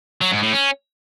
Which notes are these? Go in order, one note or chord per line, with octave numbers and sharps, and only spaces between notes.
F#3
G#2
A2
C#4